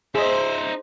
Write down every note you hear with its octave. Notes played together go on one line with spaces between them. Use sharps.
D#4 G#4 C5 D#5 E5